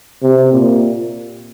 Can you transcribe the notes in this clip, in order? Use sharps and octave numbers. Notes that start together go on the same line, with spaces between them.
C3
A#2